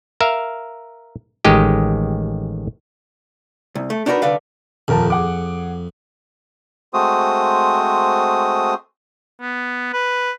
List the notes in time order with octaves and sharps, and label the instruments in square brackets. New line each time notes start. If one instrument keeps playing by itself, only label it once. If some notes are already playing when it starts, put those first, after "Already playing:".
[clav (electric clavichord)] A#4 E5 F5
A1 D#3 G#3 G4 D#5
[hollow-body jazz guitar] C2
A3
D4 D#4 F#4 G4 A#4 B4
C2 D3 D4 B4 F5
[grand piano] D#1 A#4 A5 [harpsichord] F2
[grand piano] G#4 F#5 D6
[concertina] G#3 A3 C4 F#4 C5 D#6
[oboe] B3
B4